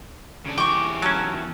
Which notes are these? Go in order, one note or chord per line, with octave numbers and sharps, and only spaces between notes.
C#3 D4
E2 G4 G5 C#6 D6
F#3 C#4 A5